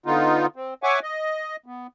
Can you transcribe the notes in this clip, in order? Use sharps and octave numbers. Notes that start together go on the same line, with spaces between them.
D3 B3 D#4 F4
C4
C#5 E5 F#5 G#5 C#6 D6
D#5
B3